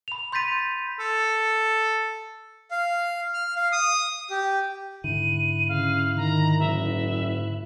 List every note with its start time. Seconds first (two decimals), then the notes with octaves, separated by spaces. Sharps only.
0.08 B5 F7
0.32 C6 G6 A6 B6 D#7 F7
0.99 A4
2.71 F5
3.34 F6
3.56 F5
3.72 D#6
4.30 G4
5.04 G#2 D3 E4 F#6 D#7
5.69 C#3 F5
6.17 D#3 A#5
6.60 F#1 E5